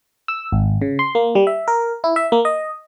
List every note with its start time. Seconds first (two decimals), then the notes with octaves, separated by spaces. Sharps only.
0.28 E6
0.52 G#1
0.82 C#3
0.99 C6
1.15 A#3
1.35 G3
1.47 E5
1.68 A#4
2.04 E4
2.16 E5
2.32 A#3
2.45 D#5